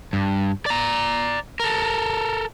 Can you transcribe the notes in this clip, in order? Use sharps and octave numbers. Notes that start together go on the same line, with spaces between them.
G2
D5 A#5
A4 A#4